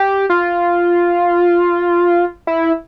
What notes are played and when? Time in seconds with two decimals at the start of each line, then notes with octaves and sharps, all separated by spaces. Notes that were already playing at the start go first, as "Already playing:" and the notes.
Already playing: G4
0.30 F4
2.47 E4